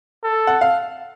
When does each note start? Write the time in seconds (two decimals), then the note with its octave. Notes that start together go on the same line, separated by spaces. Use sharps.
0.24 A4
0.47 F#5
0.61 F5